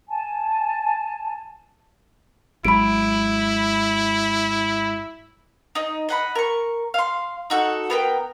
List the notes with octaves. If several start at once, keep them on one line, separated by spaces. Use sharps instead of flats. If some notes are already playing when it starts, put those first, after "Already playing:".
G#5 A5
G#1 F#3 G#3 E4 B5 D7
D#4 D#5
D#5 F#5 B5
A#4 C#6
F5 C6
D#4 F#4 A4
B3 A#4 G5